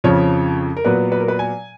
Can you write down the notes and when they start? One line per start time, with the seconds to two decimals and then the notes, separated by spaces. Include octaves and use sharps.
0.04 F2 C#3 F3 C#5
0.77 A#4
0.85 A#2 F#3 B3 B4
1.12 B4
1.20 A#4
1.28 B4
1.39 G#5